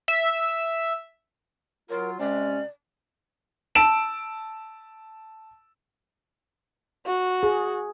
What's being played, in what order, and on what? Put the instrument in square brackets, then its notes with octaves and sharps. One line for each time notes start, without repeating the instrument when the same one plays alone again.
[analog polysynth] E5
[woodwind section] F#3 F4 [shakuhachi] A#4
[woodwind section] C3 G#3 C#4 [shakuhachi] D5
[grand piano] A5 E6 D7 E7
[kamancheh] F#4
[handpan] G#4